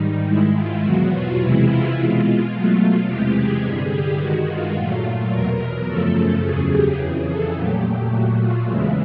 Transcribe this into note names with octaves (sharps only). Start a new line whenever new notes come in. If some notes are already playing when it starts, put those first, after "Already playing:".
Already playing: G#2 D#3 G3 D#4
G#2 D#3 G#3 E4
F4
E2 B2 F#3 F#4
F4
C3 E3 G#3 E4
F4
B2 G#3 F4
F4
B2 F#3 A3
F4
E2 C3 E3 G#3 G4
G#4
G2 D3 G3 G#4
G4
G2 D#3 G#3 F#4
F4
A#2 F#3 A3
E2 B2 F#3 A#4
F#2 C#3 F3 A3 A4
E2 C#3 F#3 G#4
G4
F2 C#3 E3 G#4
A4
A#2 F#3 A3 G4
G4
A#2 F#3 A3 F#4
F4
E2 C#3 E3 G#3 E4